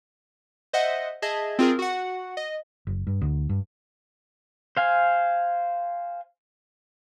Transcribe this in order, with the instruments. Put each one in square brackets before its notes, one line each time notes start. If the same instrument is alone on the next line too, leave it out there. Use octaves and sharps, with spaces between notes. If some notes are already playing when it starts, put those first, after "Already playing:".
[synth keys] C5 D#5 E5 F#5
G#4 D#5 E5 A5 G#6
C4 F4 G#4 A#4
F#4 F#5
D#5
[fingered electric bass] F#1
G2
D2
G2
[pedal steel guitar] C5 F5 G#5